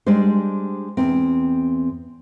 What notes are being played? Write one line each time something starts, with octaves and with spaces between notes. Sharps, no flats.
G3 G#3 D4 C5
E2 C4